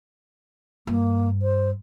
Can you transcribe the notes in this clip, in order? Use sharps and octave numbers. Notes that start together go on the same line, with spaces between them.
G2 A#3
C5